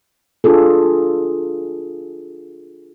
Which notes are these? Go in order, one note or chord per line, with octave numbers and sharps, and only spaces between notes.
D4 F4 G#4 A4